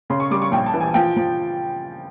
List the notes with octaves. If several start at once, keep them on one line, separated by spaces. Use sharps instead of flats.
C#3 C6
C#6
G3 D6
C#6
A#1 G5
A5
E3
G#5
F3 G5
F3